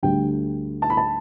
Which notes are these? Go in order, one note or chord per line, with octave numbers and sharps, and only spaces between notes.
D2 D3 G3 G5
A5
B5
A5